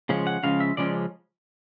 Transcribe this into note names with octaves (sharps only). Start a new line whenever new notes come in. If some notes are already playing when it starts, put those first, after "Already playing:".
C#3 F3 G#3 C#4
F#5
C#3 F3 G#3 C#4 F5
E5
C#3 F3 G#3 C#4 D5